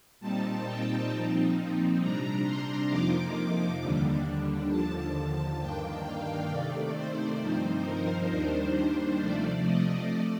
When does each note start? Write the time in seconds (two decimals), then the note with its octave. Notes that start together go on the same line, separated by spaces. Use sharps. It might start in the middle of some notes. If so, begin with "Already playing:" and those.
0.20 A#2 G3 C4 D#4 A5
0.65 G5
1.10 A#2 F3 C4 D#4
1.99 C3 G3 D4 A#5
2.45 C6
2.90 F2 C3 F3 A#3 D#4 D6
3.80 D#2 D3 G3 D4
4.70 D#2 D3 F3 A5
5.15 A5
5.60 G2 D#3 A#3 D4 G5
6.05 F5
6.50 C3 D#3 A3 D5
6.94 C5
7.40 G2 F3 C4 D#4
7.85 A#4
8.29 D#2 D#3 G3 D4 C5
9.20 C3 F3 A3 D5
9.65 D#5
10.09 A3 D5